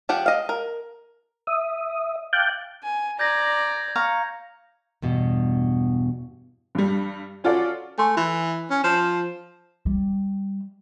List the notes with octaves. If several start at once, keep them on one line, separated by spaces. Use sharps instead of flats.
F3 G4 F#5
D#5 F5
A#4
E5 D#6
F5 G5 A5 D6 F#6 G6
G#5
D5 A#5 G6 G#6 A#6
F5 A#5 C#6
E2 G2 B2
G2 G3
C#4 F4 F#4 A4 D5
A3 G#5 C6 C#6
E3 E4
C#4
F3 E7
G3